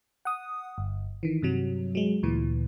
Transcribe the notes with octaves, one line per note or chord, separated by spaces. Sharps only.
F#5 D#6
G1
D#3 E3
G2 C3 F#3
F#3 G#3
D2 A#2 E3